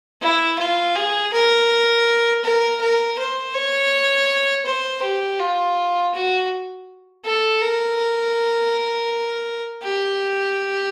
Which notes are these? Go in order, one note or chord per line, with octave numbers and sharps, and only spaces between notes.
E4
F4
G#4
A#4
A#4
A#4
C5
C#5
C5
G4
F4
F#4
A4
A#4
G4